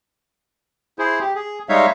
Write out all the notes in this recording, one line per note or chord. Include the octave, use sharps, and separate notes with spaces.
E4 G#4 C5
G4
G#4
G3 G#3 D#4 C#5 E5 F5